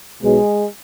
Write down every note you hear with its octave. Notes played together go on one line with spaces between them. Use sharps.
B1 B2 F#3 G#3